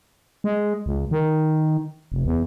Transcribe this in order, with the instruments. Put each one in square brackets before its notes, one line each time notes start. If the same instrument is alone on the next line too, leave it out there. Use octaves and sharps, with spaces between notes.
[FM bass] G#3
C#2
D#3
F1
E2